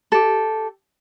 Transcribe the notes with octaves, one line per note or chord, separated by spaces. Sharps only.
G4 A4